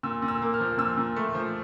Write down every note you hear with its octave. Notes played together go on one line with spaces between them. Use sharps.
A#2 E6
A#2
E6
A#3
F6
F3
A#2 E6
A#2
A3
F3